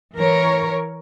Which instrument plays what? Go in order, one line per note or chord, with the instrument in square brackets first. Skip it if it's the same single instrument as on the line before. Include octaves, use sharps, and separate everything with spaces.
[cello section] E3 A#4 C#5